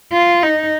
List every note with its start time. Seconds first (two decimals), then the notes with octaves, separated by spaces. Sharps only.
0.13 F4
0.43 D#4